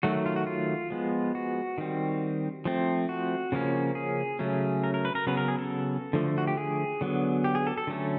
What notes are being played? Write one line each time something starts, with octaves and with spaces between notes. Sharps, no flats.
D#3 F#3 A3 F#4
F4
F#4
F4
F3 G#3 B3
F#4
D#3 G3 C4
F3 A3 C4
F#4
C#3 F3 A#3 C#4
G#4
C#3 F#3 A3 C#4
A#4
A#4
B4
A#4
C#3 F#3 B3 B4
A#4
G#4
A4
D3 F3 A3
F#4
G4
G#4
D3 F#3 B3
G4
G#4
A4
A4
D3 F#3 A3 C#4